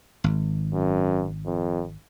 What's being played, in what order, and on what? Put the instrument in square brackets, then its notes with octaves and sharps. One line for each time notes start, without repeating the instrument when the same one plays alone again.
[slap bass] G#1
[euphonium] F#2
F2